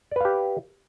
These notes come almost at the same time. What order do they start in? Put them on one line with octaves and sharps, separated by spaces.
D5 B4 F5 G4